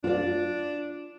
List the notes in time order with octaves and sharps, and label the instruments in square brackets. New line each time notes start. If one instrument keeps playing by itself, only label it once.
[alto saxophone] D4 [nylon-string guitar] F4 D5